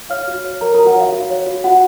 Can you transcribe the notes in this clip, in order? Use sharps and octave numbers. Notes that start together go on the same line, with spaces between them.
C#5 F5 F6
F#4
C#5
A#4 C#5 A#5
F#4 A#4 A#5
F#4 F#5
C#5 F5
F#4 F5
C#5
F#4
F#4 F#5